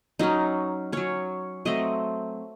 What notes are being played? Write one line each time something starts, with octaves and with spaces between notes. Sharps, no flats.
F#3 C#4 D#4
F#3 C#4 C#5
F#3 A3 C4 D#5